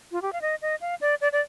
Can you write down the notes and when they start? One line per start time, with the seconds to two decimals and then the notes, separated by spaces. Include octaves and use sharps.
0.12 F4
0.22 G4
0.33 F5
0.42 D#5
0.62 D#5
0.81 F5
1.01 D5
1.21 D5
1.32 D5